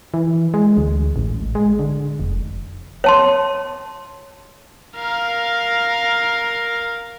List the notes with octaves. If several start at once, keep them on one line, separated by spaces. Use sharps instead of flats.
E3
G#3
D2
A1
G#3
D3
F1
C#5 A5 C6
A#4 F5